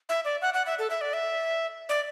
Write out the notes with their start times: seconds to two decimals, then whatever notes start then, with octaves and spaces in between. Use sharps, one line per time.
0.09 E5
0.25 D5
0.42 F#5
0.54 F#5
0.66 E5
0.79 A4
0.90 E5
1.01 D5
1.13 E5
1.89 D5